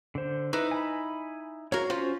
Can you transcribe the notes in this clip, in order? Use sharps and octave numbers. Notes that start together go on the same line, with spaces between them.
D3 C5
D#4 E4 B4
G#5 B5
F#4 A#4 C#5 F5
C#4 F4 F#4 C5